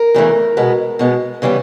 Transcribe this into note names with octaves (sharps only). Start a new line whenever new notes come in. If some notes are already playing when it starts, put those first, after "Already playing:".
Already playing: A#4
E2 C#3 E3 A3
B2 G#3 B3
B2 G#3 B3
C#3 E3 G3 B3